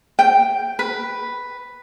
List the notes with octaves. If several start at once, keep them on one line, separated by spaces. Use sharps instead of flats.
G5
B4